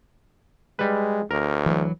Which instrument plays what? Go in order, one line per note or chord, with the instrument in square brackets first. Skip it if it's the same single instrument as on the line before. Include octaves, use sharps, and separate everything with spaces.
[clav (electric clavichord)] G3 B4 [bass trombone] G#3
[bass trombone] D2 [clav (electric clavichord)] A#4
[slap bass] E3 F#3